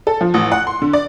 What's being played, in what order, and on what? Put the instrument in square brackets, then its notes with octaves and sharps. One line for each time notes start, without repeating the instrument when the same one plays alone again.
[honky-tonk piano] A4
F3
A1
F#5
C6
D3
D5